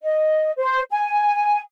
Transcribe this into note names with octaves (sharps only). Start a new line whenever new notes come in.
D#5
C5
G#5